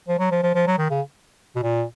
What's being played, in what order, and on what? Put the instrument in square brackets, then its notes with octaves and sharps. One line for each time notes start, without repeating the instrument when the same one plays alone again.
[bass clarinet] F3
F#3
F3
F3
F3
F#3
D#3
C#3
B2
A#2